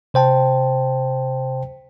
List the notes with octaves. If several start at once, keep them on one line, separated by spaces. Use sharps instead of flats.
C3 C5 G5 A5